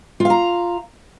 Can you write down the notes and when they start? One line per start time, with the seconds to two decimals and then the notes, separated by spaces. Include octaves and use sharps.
0.20 F4
0.25 F5
0.30 A#5